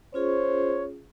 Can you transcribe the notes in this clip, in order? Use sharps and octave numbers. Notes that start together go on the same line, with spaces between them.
C#4 F4 G#4 C5 C#5